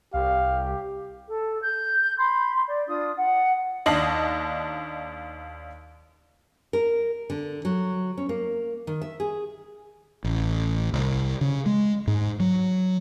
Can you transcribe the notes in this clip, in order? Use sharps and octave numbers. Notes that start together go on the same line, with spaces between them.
C2 G4 F5
A4
G6
B5 C6
D5
D4 F4 D#6
F#5
D#2 D4 D#5 A5 C7 F#7
A#4
D3
F#3
C#4
A#3
D#3
E5
G#4
A1
C2
C#3
G#3
G#2
F#3